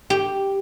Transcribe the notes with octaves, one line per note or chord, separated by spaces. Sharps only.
G4